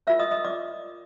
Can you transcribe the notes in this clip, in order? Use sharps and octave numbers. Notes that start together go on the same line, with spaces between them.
F4 A#4 C#5 E5 E6
D#5 D#6
D#5 D#6
D5 D6